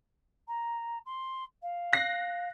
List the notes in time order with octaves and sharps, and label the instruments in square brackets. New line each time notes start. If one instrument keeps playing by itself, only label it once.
[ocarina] A#5
C6
F5
[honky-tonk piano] F#6 A#6 C7